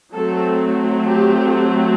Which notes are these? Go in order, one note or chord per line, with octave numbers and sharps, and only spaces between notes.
F#3 A3 C4 A4
G4